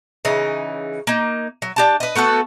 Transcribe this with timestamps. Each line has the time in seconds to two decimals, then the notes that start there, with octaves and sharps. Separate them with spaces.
0.25 C#3 E3 D#4
1.07 A#3 D#4
1.62 F#3
1.76 D4 G4 A5
2.00 B4 D#5
2.15 A3 B3 F#4 A4